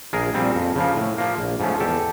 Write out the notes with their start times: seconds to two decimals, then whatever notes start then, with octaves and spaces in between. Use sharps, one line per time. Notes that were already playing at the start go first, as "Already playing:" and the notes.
0.13 A#1 G#4 A#4
0.34 A#2 G3 C4
0.55 F2
0.76 C#3 F3 A#3
0.97 A2
1.18 F3 A#3
1.38 A#1
1.60 G#2 F3 A3 C#4
1.80 E2 G4 A4